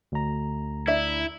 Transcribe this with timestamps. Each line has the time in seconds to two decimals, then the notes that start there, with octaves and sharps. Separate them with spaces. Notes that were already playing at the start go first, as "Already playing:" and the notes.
0.12 D2 A#5
0.88 D4 E4 E5